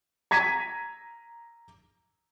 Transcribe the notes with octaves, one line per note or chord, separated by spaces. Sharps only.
A#5 G#6 B6 D#7